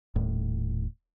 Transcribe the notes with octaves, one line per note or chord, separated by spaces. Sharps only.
D#1 A2